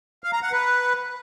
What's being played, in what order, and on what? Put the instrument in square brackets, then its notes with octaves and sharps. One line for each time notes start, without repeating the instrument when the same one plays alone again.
[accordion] F5
A#5
F#5
B4